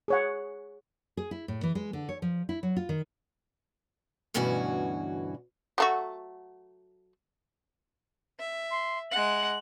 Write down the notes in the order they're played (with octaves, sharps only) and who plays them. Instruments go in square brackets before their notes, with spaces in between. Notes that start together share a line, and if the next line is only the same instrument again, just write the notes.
[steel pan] G#4 C#5 F#5
[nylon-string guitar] G#4
E4
A2
E3
G#3
D3
C#5
F3
E4
F#3
F4
D#3
[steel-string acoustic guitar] D2 G2 B2 E3 C#4 F#4
[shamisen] F#3 A3 F#4
[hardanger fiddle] E5
[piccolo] C6
[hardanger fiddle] G#3 F#5 [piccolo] F#7